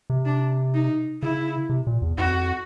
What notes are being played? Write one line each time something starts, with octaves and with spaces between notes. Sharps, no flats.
C3
D4
D#4
C#3 E4
C3
A#2
E2
F2 F#4